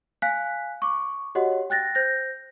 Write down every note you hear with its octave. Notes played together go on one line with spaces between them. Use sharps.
F5 G#5 F#6 B6
C#6 D6
F#4 G4 C#5 D#5 F#5
G5 F#6 A6 A#6
C5 G6 A#6